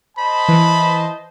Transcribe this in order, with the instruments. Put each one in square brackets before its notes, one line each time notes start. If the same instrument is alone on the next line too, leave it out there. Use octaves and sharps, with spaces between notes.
[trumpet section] C5 D#5 A5 [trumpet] B5
[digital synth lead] E3